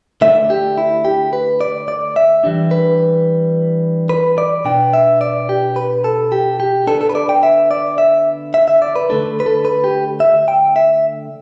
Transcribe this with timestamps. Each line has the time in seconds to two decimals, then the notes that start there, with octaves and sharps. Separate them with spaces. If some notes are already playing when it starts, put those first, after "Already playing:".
0.21 D3 A3 D4 E5
0.50 G4
0.78 E4
1.05 G4
1.33 B4
1.61 D5
1.88 D5
2.16 E5
2.44 E3 G3 D4
2.71 B4
4.09 B4
4.38 D5
4.65 B2 B3 D4 G5
4.93 E5
5.21 D5
5.49 G4
5.76 B4
6.04 A4
6.32 G4
6.60 G4
6.87 D3 B3 D4 A4
7.01 A4
7.09 B4
7.15 D5
7.29 G5
7.43 E5
7.71 D5
7.98 E5
8.54 E5
8.68 E5
8.82 D5
8.96 B4
9.09 D3 A3 D4 A4
9.40 B4
9.46 A4
9.65 B4
9.84 G4
10.20 E5
10.48 G5
10.76 E5